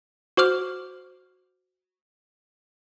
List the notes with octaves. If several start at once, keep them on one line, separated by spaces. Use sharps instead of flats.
F#4 C5 D6 F6